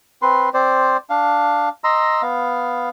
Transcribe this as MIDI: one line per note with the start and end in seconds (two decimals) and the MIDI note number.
0.22 0.49 60
0.22 0.49 71
0.22 0.49 84
0.54 0.97 60
0.54 0.97 72
0.54 0.97 74
1.10 1.69 62
1.10 1.69 77
1.84 2.22 75
1.84 2.22 82
1.84 2.22 84
1.84 2.22 88
2.22 2.89 59
2.22 2.89 77